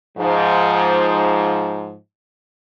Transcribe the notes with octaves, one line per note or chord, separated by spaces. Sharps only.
G#2 F3